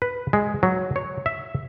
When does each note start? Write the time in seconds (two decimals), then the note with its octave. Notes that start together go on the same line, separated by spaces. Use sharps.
0.02 B4
0.33 G#3
0.63 F#3
0.96 C#5
1.26 E5